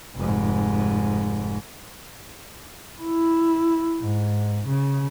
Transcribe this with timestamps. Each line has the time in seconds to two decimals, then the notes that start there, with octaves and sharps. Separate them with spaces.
0.16 F1 G#2
3.02 E4
4.02 G#2
4.67 C#3